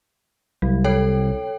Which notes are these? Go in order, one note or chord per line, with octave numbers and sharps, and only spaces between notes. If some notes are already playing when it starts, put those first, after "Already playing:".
C2 F#3
A4 C#5 G5